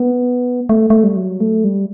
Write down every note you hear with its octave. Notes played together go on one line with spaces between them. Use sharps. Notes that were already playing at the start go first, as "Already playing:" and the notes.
Already playing: B3
A3
A3
G3
F#3
A3
G3